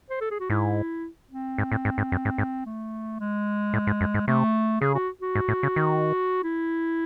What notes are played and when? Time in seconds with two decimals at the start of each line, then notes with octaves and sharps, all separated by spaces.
0.10 C5
0.21 A4
0.31 G#4
0.40 F#4
0.50 G#2 E4
1.31 C4
1.58 G#2
1.72 A2
1.85 G#2
1.98 G#2
2.12 F#2
2.25 G#2
2.38 G#2
2.66 A3
3.20 G#3
3.74 A2
3.87 G#2
4.01 F#2
4.14 G#2
4.28 C3 A3
4.81 C#3 G#4
4.95 F#4
5.21 F#4
5.35 G#2
5.48 A2
5.63 C#3
5.76 D#3
6.44 E4